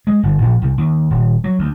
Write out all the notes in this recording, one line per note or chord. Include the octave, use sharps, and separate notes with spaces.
G#3
G1
A#1
C2
D#2
D#1
F#3
D2